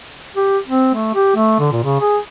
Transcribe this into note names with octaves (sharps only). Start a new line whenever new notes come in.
G4
C4
A3
G4
A3
D3
A#2
C#3
G#4